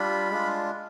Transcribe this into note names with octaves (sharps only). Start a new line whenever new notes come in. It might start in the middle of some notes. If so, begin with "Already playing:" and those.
Already playing: G3 D4 F4 B5
G#3 D4 F4